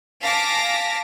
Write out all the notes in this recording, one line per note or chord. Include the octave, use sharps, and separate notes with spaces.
F5 G#5 A5 D6 A#6 B6